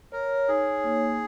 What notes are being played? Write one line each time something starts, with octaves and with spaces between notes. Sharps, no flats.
A#4 C#5
D#4 G#4
A#3